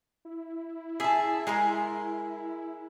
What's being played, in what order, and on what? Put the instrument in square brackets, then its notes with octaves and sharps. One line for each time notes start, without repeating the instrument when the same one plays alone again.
[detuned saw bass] E4
[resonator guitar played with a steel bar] G#4 A5 [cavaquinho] E5
[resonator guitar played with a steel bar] G#3 [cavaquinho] G#4 A#4 C6